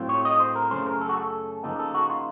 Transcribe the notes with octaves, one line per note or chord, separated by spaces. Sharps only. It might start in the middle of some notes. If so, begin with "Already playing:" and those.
Already playing: A2 F#3 C4 F4
C#5
D#5
C5
A#4
F#2 C#3 A3 C#4 C5
A#4
A4
F#4
A4
C#3 F3 A#3 D#4 A4
A4
F#4
F4